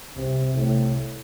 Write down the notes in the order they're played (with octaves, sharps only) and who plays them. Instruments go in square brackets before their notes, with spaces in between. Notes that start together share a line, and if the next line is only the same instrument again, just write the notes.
[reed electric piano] C2 [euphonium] C3
[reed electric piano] C2 [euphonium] A2